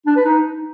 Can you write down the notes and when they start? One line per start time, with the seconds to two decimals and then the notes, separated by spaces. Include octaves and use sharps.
0.06 D4
0.15 B4
0.25 D#4